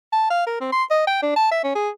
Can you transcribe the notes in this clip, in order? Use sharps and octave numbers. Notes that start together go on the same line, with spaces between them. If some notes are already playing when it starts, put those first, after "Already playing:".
A5
F5
A#4
C4
C6
D#5
G5
D4
A5
E5
C#4
G#4